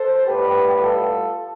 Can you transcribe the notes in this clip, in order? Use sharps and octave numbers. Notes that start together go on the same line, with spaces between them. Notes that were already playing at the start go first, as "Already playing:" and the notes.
Already playing: A4 C5
A2 G3 B3 G4 B4
F4 A4